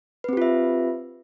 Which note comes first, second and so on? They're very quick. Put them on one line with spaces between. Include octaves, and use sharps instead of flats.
B4 C4 G4 F4 E5